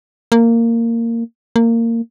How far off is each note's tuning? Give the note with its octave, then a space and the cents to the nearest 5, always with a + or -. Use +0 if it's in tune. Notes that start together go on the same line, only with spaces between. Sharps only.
A#3 -15
A#3 -20